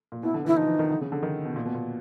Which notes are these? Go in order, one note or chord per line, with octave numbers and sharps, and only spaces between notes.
A#2
B2 E4
D3
E3 E4
F3 D#4
E3
D#3
D3
C#3
D3
D#3
B2
A#2
B2
A#2